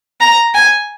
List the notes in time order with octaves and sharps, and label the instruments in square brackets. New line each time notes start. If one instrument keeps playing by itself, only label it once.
[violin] A#5
G#5